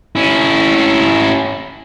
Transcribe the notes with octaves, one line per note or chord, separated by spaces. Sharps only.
C#4 E4